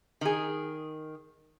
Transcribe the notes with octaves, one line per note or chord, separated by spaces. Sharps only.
D#3 G#4